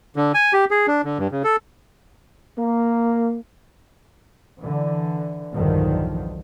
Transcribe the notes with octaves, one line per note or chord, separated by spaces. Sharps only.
D3
G#5
G4
G#4
D4
D3
G2
C#3
A4
A#3
D3 E3
B1 E2 G2 D3 D#3 F3